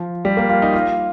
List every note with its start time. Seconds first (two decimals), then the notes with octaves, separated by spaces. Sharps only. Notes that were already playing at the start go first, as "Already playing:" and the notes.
Already playing: F3
0.25 G3
0.37 A#3
0.49 F4
0.62 D#4
0.73 F4